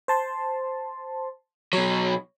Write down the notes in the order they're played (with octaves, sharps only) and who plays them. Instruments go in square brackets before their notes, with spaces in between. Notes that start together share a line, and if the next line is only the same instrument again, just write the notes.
[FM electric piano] C5 A5 C6
[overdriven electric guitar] B2 F#3 [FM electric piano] C#5